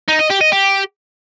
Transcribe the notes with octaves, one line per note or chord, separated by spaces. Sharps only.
D#4
D#5
G4
D#5
G4